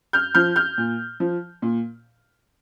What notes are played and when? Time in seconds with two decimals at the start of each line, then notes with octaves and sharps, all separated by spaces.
0.13 F6 G6
0.35 F3 F6 G6
0.56 F6 G6
0.78 A#2
1.20 F3
1.62 A#2